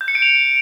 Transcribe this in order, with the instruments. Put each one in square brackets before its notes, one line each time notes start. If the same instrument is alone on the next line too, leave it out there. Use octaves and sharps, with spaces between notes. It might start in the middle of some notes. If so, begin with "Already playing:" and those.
[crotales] G6
C#7
D7
F7